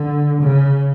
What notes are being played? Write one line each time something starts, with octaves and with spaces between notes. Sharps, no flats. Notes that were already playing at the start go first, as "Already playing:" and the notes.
Already playing: D3
C#3